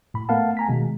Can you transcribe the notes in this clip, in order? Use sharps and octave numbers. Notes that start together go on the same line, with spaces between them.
A2 B5
A3 B3 A#4 F5 F#5 A5
G#5 A#5 B6
B2 D#3 G#3